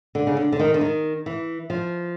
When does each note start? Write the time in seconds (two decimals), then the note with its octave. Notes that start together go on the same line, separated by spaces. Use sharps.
0.15 D3
0.27 C#3
0.37 D3
0.52 D3
0.60 D#3
0.74 D3
0.81 D#3
1.26 E3
1.70 F3